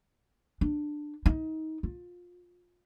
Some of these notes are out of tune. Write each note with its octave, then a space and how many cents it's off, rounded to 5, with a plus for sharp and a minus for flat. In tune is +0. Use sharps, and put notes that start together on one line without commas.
D4 +15
D#4 +25
F4 +20